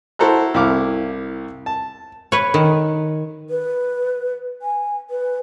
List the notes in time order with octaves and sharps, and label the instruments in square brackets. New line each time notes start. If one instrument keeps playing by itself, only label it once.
[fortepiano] E4 F#4 A4 C5 A#5 F#6
C2 E4 F5 D6 F6
A5
[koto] B4 C#5
D#3
[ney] B4
G#5
B4